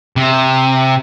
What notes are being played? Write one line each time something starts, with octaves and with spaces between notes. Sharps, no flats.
C3